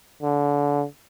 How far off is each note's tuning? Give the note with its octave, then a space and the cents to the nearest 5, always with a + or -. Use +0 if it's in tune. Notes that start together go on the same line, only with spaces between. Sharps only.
D3 -30